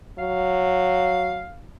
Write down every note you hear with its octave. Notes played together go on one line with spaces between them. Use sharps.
F#3 F5